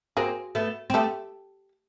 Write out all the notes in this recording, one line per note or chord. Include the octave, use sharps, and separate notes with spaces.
A#3 C4 F#4 G#4
A3 B3
C4
A3 B3 G4 A4